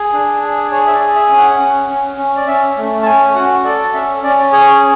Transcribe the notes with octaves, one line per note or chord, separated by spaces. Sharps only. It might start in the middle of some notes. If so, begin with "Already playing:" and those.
Already playing: G#4
D4
G#4
G#4 C#5
E5
D5
G#4
E5
C#4 G#5
F#5
C#4
C#4
C#4
D5
C#4 E5
A3
A5
C#4 G#5
F#4 F#5
A4 D5
C#4 E5
C#4 D5
G#4 C#5
C#5